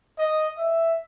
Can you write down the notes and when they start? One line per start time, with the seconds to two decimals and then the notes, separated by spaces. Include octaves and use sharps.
0.18 D#5
0.58 E5